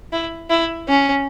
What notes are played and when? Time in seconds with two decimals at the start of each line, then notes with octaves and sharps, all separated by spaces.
0.13 E4
0.50 E4
0.88 C#4